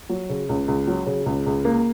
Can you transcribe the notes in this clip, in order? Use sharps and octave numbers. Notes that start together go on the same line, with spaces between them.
F#3
C#3
C#2
C#2
F#3
C#3
C#2
C#2
A#3